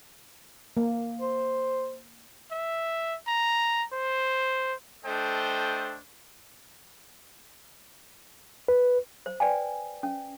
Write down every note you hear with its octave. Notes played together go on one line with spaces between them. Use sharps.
A#3
C5
E5
A#5
C5
A3 D4 A4 C5 D#5 G5
B4
C5
B4 D5 G5 G#5
C#4